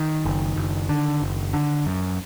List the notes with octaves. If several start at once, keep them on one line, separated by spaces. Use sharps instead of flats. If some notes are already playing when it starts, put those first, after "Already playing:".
Already playing: D#3
F#1
F#1
D3
F#1
D3
F#2